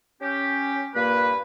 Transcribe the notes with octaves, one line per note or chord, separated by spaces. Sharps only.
C#4 G4
G2 A#2 A#3 B4